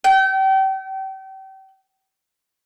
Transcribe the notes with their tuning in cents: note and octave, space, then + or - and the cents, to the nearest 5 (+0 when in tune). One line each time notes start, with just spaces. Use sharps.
G5 -35